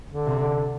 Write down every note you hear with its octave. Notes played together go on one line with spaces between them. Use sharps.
D3
C3
D3